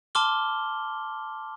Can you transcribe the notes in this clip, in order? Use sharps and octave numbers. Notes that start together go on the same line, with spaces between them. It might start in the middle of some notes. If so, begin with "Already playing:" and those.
A5 C6 D6 F6 G7